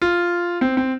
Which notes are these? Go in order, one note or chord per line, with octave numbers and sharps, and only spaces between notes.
F4
C4
C4